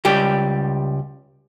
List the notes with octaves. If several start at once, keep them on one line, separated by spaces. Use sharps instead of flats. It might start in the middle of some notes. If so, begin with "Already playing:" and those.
C#2 G3 G4